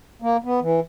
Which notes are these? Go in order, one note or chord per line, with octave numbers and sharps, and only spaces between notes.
A#3
B3
E3